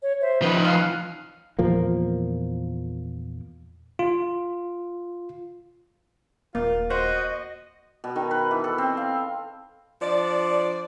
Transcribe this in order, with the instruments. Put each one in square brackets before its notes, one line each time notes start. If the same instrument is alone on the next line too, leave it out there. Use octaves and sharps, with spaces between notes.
[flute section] C#5
C5 E5
[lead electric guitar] F3 D#4 [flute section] B4
[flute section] F5 F6 F#6
[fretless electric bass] E2 A#2 F3 A#3
[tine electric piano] F4
[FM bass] D#1 [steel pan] A#3 [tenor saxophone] F4
[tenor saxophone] F#4 [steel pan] C5 [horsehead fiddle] D#5
[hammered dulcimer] B2
D#3
B4
E3
A4
C4
F5
[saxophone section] F3 D4 D5